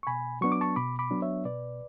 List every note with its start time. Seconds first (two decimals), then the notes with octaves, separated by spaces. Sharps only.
0.03 C#6
0.07 B2 G#5 B5
0.41 F#3 B3 D4 C#6
0.52 D6
0.61 A5 C#6
0.76 B2 B5 D6
0.99 B5 D6
1.10 F#3 B3 D4
1.22 C#5 E5
1.45 B2 B4 D5